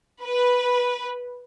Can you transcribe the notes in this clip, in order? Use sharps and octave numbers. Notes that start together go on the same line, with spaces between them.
B4